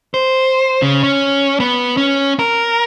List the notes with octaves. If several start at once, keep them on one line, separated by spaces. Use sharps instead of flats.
C5
C#3
C#4
B3
C#4
A#4